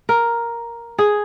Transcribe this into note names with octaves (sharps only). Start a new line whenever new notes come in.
A#4
G#4